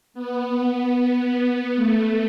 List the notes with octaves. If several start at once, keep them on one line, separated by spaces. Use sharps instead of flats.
B3
A3